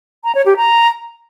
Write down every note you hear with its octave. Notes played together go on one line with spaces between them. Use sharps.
A#5
C#5
G4
A#5